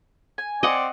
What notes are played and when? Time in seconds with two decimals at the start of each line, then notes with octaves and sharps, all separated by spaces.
0.38 G#5
0.63 C4 D5 D#5 F#5